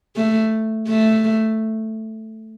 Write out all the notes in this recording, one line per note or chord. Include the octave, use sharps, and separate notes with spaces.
A3
A3